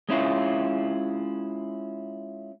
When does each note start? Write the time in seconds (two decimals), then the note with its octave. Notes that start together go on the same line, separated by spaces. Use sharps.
0.09 G#3 C#4 E4 F4